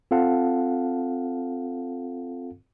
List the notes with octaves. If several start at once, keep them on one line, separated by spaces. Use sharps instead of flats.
C4 F4 A4 F5 F#5 A5